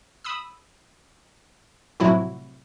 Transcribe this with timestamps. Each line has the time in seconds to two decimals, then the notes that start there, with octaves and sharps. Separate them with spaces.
0.24 B5 D#6 E6
2.00 A2 C3 F3 F#3 E4 F#4